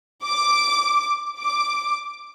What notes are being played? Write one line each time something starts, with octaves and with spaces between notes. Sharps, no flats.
D6
D6